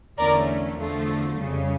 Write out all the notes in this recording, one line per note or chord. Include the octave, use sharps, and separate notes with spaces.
E2 D3 A3 C#4 A#4 D5
E2 D3 F3 A3
F2 C#3 G3